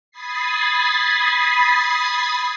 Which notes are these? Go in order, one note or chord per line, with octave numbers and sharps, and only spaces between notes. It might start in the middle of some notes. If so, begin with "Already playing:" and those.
B5 D#6 G#6 A6 B6 C7